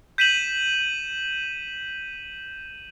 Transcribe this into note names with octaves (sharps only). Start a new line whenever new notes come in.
G6 B6 D#7 E7 F#7